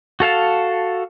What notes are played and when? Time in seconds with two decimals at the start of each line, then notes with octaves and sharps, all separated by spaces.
0.20 F#4 A4 F5 A5